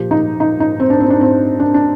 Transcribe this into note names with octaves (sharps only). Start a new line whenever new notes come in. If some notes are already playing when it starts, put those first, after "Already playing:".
Already playing: A#2 F3 G4
D#4
D#4
D#4
C4
D4
C4
D4
C4
D4
D4